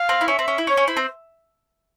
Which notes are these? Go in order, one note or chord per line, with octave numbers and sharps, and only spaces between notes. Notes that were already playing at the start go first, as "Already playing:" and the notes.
Already playing: F5
C4
E4
C#4 E5
C4
C#4
E4
C#4 C#5
C#4
E4 C5
C4